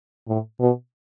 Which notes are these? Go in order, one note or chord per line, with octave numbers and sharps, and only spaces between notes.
A2
B2